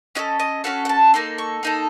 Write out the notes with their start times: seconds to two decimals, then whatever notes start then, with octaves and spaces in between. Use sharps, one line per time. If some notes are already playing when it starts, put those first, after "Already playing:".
0.15 C#4 F#4 A4 D#5
0.39 D#5
0.64 C#4 F#4 A4 F5
0.85 F#5
0.89 A5
1.14 A#3 D#4 A4 C6
1.38 C#6
1.63 A#3 D#4 A4